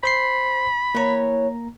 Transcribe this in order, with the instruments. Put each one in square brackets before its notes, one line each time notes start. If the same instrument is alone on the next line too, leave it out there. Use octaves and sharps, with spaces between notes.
[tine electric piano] C5 C6 C7 [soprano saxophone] B5
[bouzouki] E3 C#5 [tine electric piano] A#3 A#5